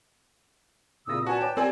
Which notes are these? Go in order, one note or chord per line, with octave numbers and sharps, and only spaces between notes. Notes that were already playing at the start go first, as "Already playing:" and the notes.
C2 A#2 C#3 D#6 E6 A#6
F#4 B4 D5 G#5 A5
C#5 G5 G#5 D6
C4 G4 A#4 D5 G#5 A5 E6